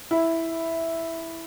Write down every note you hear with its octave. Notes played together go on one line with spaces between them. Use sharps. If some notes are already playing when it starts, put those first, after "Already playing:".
E4